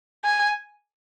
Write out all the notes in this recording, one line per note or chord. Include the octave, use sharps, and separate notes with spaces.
G#5